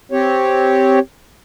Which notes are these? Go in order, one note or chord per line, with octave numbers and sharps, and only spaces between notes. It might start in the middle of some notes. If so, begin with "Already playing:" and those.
C4 G4 C#5